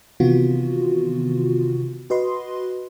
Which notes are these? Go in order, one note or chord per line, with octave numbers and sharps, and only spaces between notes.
C3 D#3 E3 B3 F4 F#4
F#4 B4 D#5 C6